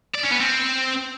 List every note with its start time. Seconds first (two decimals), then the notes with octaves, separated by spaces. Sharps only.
0.15 D5
0.23 C#4
0.32 B3
0.40 C4